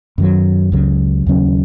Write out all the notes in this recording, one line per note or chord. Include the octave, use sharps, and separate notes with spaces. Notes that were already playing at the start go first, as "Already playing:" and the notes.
F#2 D#3 F#3
C#2 C#3 F#3
D#2 C#3 F#3 C#4